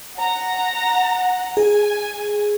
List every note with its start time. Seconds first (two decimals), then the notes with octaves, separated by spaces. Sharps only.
0.17 F#5 A#5
1.57 G#4 G#5